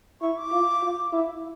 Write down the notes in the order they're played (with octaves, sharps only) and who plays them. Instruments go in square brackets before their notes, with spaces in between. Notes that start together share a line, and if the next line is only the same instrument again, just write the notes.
[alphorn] E4 [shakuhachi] C#6
[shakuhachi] D6
[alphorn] F4
F4
E4